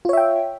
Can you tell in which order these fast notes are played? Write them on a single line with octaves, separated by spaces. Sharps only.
F4 C#5 E5 G5